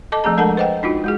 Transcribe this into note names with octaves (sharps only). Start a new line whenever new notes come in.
A4 D#5 A5 D6
F3 A3 C4 G#4 A#5
G#3 D4 A4 A#4 F#5 A5
B4 C5 D#5 F#5 G5
D4 D#4 F4 F#4
G#3 F#4 G#4